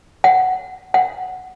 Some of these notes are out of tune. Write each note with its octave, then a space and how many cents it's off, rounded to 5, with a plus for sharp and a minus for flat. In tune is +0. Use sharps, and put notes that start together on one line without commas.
F#5 +5
F#5 +0